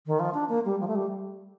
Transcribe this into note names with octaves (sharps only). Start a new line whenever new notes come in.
D#3
F3
D4
A#3
G3
F3
A3
G3